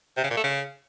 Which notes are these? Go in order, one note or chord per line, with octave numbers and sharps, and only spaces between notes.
C3
C#3
A#2
A3
C#3